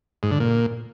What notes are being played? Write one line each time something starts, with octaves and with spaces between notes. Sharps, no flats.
G#2
D3
A#2